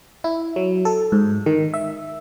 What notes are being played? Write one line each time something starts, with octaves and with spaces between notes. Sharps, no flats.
E4
F#3
A4
G#2
D#3
E5